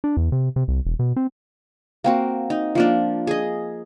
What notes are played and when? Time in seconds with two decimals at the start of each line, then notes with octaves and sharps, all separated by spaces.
0.04 D4
0.17 E2
0.32 C3
0.56 C3
0.68 C2
0.85 E1
0.99 B2
1.16 C4
2.04 A#3 C4 F#4
2.50 D#4
2.75 F3 A#3 D4
3.27 G#4 D#5